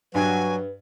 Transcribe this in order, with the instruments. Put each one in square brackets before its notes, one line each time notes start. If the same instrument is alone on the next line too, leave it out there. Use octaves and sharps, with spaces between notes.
[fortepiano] G2 [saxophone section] F#3 [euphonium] B4 [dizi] G#5